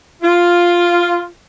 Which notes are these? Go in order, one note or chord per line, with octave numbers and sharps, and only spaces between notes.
F4